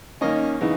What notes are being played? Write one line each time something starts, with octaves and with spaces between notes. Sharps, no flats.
D#3 A#3 C#4 D#5
C#3 E3 B3 D#4